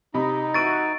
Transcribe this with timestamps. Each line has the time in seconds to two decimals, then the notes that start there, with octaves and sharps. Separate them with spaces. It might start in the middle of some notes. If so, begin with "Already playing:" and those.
0.14 C3 D#4 D#5 B5
0.54 E3 F#4 C#6 E6 A6 D7 D#7